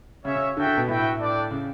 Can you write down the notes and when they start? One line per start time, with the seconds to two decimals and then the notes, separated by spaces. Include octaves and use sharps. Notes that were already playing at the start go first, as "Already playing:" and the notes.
0.25 C#3 C#4 F#4 C#5 E5
0.35 C#3
0.56 D3 F#4 A4 E5 G5
0.67 D3
0.77 B2
0.88 A2 F#4 B4 E5 G5
1.19 D4 A4 D5 G5
1.51 C#3